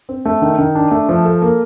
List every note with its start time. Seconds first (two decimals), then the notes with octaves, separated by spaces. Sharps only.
0.09 C4
0.25 A3
0.42 D#3
0.58 D#3
0.75 D4
0.91 A3
1.09 F3
1.25 A4
1.42 A#3